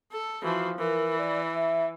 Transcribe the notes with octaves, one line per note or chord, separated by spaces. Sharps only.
A4
E3 F3 F#4
E3 A#4
D5
E5